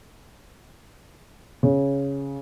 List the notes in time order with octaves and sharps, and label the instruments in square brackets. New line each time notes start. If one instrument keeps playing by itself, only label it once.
[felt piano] C#3